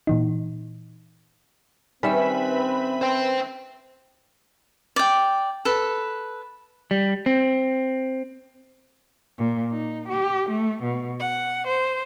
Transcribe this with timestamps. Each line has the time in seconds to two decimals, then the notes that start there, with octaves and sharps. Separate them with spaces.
0.07 A#2 E3 D#4
2.03 D#3 G3 C4 C#4 B4 E5 B5
3.02 C5 G5
4.96 D5 G5
5.65 A4 B4
6.91 G3
7.26 C4
9.39 A#2
9.71 D#4
10.09 G4
10.49 A3
10.83 B2
11.20 F#5
11.68 C5